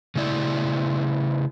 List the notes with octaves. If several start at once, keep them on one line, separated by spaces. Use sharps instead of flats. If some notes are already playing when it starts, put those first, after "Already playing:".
C#3 A3 E4 D5